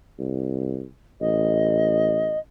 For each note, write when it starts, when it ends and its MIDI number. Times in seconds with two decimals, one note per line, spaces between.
0.19 0.85 36
1.21 2.36 33
1.21 2.39 75